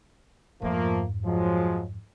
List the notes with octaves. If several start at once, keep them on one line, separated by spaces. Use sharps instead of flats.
F2 G#2 F3 A3 A#3
F3 F#3 G#3